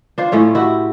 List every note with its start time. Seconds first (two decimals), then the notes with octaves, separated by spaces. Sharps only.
0.18 D4 F4 C5
0.32 A2 A3 C#4 C#5
0.55 E4 F#4 G4